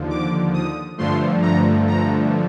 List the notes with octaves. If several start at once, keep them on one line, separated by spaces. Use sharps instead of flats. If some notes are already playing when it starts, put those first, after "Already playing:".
Already playing: D#2 D3 F3
D6
D#6
G2 D3 F3 A3 C6
A#5
A#5